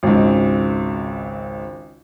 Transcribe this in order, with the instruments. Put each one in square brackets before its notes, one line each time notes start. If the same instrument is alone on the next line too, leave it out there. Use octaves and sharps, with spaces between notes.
[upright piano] G#1 C#2